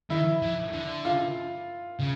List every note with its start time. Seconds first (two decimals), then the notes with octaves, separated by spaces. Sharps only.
0.10 D#3 E4
0.42 E3
0.73 D3
1.05 F4
2.00 C#3